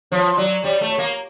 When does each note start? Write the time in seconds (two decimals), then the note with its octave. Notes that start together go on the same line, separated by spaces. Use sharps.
0.12 F3 C#5
0.37 F#3 D5
0.64 G3 C#5
0.81 A3
0.89 C#5
0.98 A#3